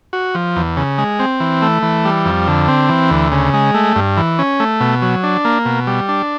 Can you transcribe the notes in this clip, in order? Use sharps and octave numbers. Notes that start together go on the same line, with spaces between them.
F#4
F3
E2
C#3
G#3
C4
E3
A3
E3
G3
F2
D3
C4
E3
D2
C#3
G#3
A3
G2
E3
C#4
A3
B2
F#3
D4
A#3
B2
G3
D4